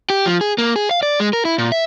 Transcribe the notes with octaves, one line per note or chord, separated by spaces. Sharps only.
G4
F3
G#4
A#3
G#4
F5
D5
G#3
A#4
E4
A#2
E5